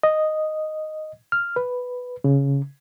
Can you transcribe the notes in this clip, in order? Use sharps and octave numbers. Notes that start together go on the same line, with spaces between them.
D#5
F6
B4
C#3